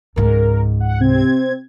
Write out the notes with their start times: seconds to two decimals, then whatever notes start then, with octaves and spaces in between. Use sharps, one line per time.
0.16 C#2 G#2 A#4
0.80 F#5
1.00 C3 C4 G#6